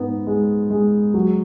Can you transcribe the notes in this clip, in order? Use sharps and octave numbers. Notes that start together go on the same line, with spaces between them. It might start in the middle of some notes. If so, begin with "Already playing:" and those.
Already playing: G#2 B3 D#4
G#3
G#3
F#3